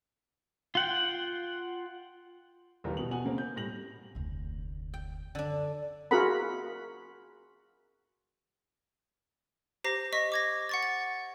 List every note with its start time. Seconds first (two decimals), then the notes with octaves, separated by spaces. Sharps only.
0.75 F4 F#5 G5
2.84 G1 D#2 E3 F3 G4 A#4
2.97 B2 F#7
3.11 B2 F#5 G#5 F#7
3.24 C#3 A#3 C4
3.38 G6
3.56 A2 G3 A#6 F#7
4.15 F1 D2
4.94 G5
5.35 F#2 D3 D4
6.11 F4 F#4 G#4 A#4 F#5 B5
9.84 G4 C5 A#5 A#6 C7
10.13 D#5 C#6 A#6 B6
10.32 D6 G#6 A#6
10.69 F#5 C#6 A6
10.83 A6